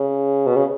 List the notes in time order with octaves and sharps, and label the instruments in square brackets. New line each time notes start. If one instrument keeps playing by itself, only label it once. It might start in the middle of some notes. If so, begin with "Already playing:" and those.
Already playing: [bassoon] C#3
B2
C#3